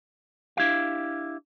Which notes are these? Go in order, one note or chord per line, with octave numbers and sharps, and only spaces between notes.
D4 E4 G4 F5